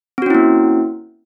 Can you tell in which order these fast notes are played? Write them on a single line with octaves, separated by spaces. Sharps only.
C4 F#4 C#4 E4 A#3